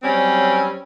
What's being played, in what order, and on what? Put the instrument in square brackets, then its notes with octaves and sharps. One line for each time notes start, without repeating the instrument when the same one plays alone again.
[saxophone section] F#3 G3 C4 C#4